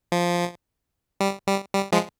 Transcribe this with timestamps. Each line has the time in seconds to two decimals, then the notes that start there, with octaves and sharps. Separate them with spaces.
0.12 F3
1.21 G3
1.47 G3
1.75 G3
1.92 F3 G#3